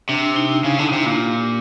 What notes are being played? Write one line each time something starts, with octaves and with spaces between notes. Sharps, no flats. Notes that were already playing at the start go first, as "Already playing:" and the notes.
C3 D4
D#4
C#3 E4
D3
C#3 E4
C3
A#2 F4
G4